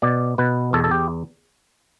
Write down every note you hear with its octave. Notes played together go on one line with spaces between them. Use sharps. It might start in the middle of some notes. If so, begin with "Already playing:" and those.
B2 D5
B2 B4
E2 A4
A4
G4